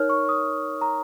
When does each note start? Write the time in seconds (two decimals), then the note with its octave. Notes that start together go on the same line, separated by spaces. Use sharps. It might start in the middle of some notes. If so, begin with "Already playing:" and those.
Already playing: D#4 A#4 C#5 F6
0.09 C#6
0.29 D#6
0.81 A#5